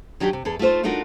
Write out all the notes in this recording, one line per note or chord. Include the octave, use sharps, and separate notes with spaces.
D#3 F#3 D4 D#4 G4
C3
E2 G#4 A4
A3 D#4 F4 C5
A3 D4 D#4 F4 F#4 A#4